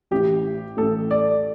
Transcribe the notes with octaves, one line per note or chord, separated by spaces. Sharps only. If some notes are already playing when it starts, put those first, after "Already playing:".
A1 A2 A3 G4
A1 A2 A3 A4
D5